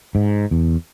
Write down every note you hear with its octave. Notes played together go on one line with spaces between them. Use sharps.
G#2
E2